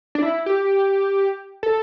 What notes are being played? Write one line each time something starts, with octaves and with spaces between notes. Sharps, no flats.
D4
E4
G4
A4